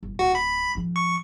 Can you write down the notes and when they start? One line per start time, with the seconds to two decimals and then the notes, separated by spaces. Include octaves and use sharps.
0.03 G1
0.19 D1 F#4
0.35 B5
0.75 G#2 F3
0.96 C#6